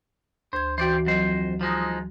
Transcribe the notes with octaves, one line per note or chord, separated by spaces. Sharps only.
D2 C5 G#6
E3 F#4 C5 D5 G5
F2 F#3 C5 D#5
F3 G#3 D#4